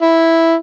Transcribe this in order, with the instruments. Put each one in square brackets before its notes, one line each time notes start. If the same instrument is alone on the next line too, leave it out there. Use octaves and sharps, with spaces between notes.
[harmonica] E4